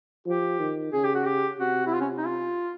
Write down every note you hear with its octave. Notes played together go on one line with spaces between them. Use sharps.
F3 G4
D#3
C#3 G#4
G4
F#4
G4
C3 F#4
E4
F4
C#4
D#4
F4